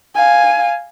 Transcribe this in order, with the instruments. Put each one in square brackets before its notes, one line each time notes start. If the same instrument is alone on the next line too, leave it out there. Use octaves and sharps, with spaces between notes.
[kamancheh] F5 G#5